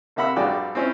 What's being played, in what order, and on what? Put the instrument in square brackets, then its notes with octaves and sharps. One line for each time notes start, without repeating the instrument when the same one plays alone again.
[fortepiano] C3 A#3 E5 F#5 B5 E6
A#1 G2 F#4 G#4 D5 G5
C4 C#4 E4